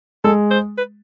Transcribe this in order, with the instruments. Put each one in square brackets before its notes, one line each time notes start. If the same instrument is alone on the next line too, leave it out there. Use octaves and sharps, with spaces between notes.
[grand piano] G#3 [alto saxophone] A4
[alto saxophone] C5
B4